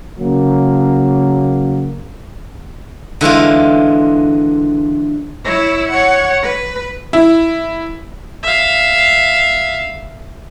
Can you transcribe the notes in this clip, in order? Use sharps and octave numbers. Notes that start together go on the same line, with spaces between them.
C#3 F#3 A#3
D3 E3 G#3 F4
E4 C#5
C#5 F#5
B4
E4
E5 F5